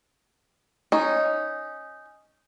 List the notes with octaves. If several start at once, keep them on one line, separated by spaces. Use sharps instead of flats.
C#4 D#4